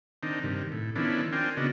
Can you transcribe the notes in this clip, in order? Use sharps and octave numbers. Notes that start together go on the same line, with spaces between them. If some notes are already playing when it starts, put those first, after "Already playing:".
D#3 C4 D4 D#4
G2 C3 D#3
A2
D#3 F3 B3 C#4 D4 E4
C4 D4 F4 A#4 G5 G#5
C#3 B3 D4 F#4 D#5